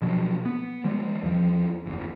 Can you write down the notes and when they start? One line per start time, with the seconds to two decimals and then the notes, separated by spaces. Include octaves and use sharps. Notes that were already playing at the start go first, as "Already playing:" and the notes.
0.02 B2 F3 F#3
0.45 B3
0.84 E3 G3 G#3
1.23 E2 F3
1.86 F#1 E2